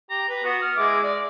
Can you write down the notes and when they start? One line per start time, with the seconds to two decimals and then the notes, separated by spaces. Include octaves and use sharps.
0.10 G4 A#5
0.29 B4
0.44 B3 F#4
0.62 F6
0.77 G#3 E4 D6
1.03 D5